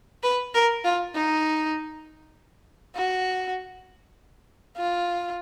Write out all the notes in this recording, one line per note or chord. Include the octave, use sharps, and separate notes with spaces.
B4
A#4
F4
D#4
F#4
F4